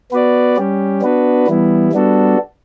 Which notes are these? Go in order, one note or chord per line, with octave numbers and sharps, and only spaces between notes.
B3 F#4 B4 D5
G3 C#4 G4
B3 D4 F#4 B4
E3 G3 B3 E4
G3 B3 D4 F#4 A4